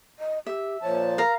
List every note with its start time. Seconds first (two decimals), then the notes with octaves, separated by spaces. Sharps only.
0.19 D#5
0.46 G4 E5
0.82 A#2 F3 C#5 A5
1.18 A#4 F5 A#5